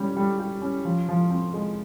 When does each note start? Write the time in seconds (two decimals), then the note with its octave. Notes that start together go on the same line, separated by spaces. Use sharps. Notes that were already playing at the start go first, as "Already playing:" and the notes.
Already playing: G3 C#4 G4
0.17 G3
0.39 G4
0.62 C#4
0.85 F3
1.09 F3
1.31 C4
1.54 G#3